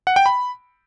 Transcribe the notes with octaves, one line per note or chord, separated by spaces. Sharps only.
F#5
G5
B5